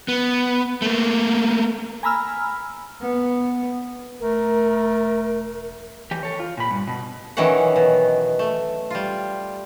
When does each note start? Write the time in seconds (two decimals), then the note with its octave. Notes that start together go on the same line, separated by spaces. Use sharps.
0.08 B3
0.82 A3 A#3
2.03 G#5 A#5 B5 E6 F6
3.02 B3
4.20 E1 A3 A#4
6.11 E3 G4
6.23 A4 C#5
6.40 F4
6.57 A#2 B5
6.71 G2
6.87 B2
7.37 D#3 E3 F#3 C#4 F#5
7.76 B2
8.39 A3
8.90 G3 F4